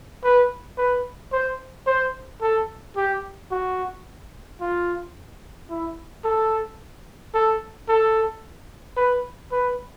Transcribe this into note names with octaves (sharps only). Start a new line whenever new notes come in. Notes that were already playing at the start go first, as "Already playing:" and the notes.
B4
B4
C5
C5
A4
G4
F#4
F4
E4
A4
A4
A4
B4
B4